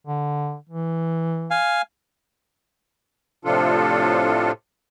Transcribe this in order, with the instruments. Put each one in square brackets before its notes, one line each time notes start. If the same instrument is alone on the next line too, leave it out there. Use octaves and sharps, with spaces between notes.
[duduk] D3
E3
[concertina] F5 G#5
[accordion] A2 C3 F3 D4 F4 A4